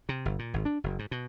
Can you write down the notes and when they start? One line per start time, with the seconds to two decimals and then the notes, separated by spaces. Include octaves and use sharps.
0.09 C3
0.25 G1
0.39 A#2
0.54 G#1
0.65 D4
0.84 F#1
0.99 G#2
1.11 B2